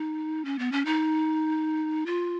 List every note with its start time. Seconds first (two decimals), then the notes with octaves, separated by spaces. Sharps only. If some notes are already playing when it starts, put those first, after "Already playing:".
Already playing: D#4
0.45 C#4
0.59 B3
0.72 C#4
0.86 D#4
2.06 F4